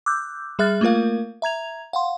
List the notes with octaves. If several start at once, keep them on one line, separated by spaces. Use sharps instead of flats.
D6 E6 F#6 G6
G3 G#4 E5 F6 F#6 A6
A3 A#3 F4 A#4 F5
E5 A#5 G#6 F7
F5 F#5 C6